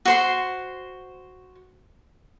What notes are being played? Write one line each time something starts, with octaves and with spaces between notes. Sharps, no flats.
F#4 C5 C6